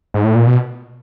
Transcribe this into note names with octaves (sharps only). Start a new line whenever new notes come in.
G#2
A2
A#2
B2